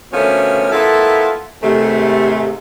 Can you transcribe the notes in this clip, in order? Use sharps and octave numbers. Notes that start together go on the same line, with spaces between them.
B2 D3 F3 A3 A#3 C#4
A#3 B3 E4 F4 A4
D#2 G#2 C3 A3